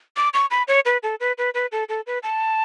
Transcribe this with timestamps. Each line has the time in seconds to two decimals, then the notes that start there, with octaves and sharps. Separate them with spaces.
0.17 D6
0.34 C#6
0.51 B5
0.68 C#5
0.85 B4
1.03 A4
1.20 B4
1.38 B4
1.54 B4
1.72 A4
1.89 A4
2.07 B4
2.23 A5